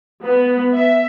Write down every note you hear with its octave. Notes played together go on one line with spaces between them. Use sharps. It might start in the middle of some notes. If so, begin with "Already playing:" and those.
B3
E5